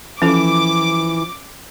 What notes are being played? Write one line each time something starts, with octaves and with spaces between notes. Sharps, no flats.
E3 F3 C#4 A4 D6